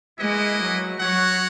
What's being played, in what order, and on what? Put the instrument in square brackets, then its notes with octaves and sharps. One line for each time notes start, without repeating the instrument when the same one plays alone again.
[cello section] G#3 [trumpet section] A#3 E4 B4 D#5
[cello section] F#3
[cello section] F#3 [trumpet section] F#4 C#5 F#5